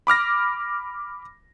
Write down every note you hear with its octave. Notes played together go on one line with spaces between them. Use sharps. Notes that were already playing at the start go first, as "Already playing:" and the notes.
B5 D6 F6 A#6